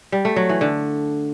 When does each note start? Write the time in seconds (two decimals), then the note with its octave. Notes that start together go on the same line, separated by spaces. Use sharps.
0.12 G3
0.25 A3
0.36 F#3
0.49 E3
0.61 D3